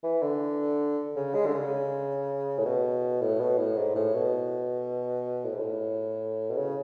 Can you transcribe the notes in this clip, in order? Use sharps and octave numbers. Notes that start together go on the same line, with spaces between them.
E3
D3
C#3
G#3
D3
C#3
A2
B2
A2
B2
A2
G#2
A2
B2
A2
G#2
A2
B2
C#3